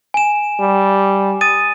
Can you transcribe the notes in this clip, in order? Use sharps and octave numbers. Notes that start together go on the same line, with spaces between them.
G#5 E7
G3
D#6 A6 D#7